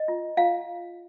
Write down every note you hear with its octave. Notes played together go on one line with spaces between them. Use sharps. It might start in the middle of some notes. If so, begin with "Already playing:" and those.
Already playing: D#5
F4
F4 F5